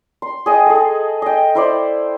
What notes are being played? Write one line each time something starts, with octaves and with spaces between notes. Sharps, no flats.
C6
G#4 D#5 G5
G#4 A4
D#5 G5
E4 C5 D5